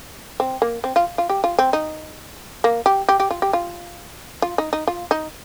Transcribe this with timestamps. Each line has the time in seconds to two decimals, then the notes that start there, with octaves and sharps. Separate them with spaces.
0.40 C4
0.62 A#3
0.84 C4
0.96 F4
1.18 F4
1.30 G4
1.44 F4
1.59 C4
1.73 D#4
2.64 A#3
2.86 G4
3.09 G4
3.20 G4
3.31 F4
3.42 G4
3.53 F4
4.42 F4
4.58 D#4
4.73 D#4
4.87 F4
5.11 D#4